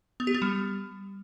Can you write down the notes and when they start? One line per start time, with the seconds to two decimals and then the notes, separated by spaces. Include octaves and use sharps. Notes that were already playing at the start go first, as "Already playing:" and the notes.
0.20 B3
0.27 G4
0.34 B3
0.42 G3